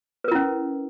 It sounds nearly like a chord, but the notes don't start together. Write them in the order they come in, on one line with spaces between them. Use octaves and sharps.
B4 A#4 E4 C#4